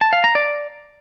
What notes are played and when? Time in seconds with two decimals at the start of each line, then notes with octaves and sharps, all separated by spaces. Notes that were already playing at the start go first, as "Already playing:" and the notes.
0.01 A5
0.13 F5
0.24 A#5
0.35 D5